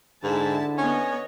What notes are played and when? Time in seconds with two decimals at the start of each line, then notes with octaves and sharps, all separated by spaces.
0.24 G#2 D3 E4 A5
0.78 B3 C#4 C#5 D#5